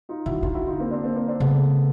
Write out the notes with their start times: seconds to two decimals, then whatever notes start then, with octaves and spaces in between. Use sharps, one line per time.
0.09 D#4 F4
0.26 D#3 E4 F#4
0.43 D3 D#4 F4
0.54 E4 F#4
0.67 D#4 F4
0.80 A#3 C4
0.91 C4 D4
1.04 A#3 C4
1.16 A#3 C4
1.28 C4 D4
1.40 C#3 A3 B3